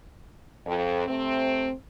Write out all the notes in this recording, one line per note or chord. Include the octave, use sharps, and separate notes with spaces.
F2
C3 A3 C4